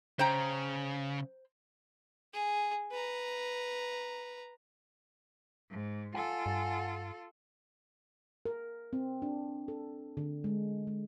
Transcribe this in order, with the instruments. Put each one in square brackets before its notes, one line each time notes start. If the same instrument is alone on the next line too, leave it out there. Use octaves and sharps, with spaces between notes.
[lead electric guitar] C#3 [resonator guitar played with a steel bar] C5 G5 A#5
[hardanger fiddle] G#4
B4 A#5
[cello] G#2
[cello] F4 A4 [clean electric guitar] F#5 G#5
[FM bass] G2
[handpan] A#4
C4
D4
A4
D3
G#3
G#3